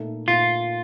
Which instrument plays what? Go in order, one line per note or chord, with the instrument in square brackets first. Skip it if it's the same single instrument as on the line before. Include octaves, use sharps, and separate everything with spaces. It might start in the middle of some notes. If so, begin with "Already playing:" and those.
Already playing: [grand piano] A#2 A3 D#4 A4
[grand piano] A#2 A3 D#4 A4 [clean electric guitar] F4